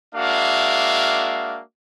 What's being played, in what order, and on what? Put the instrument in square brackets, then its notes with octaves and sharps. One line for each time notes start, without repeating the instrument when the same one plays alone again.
[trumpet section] G#3 A#3 D4 F#4 E5 F5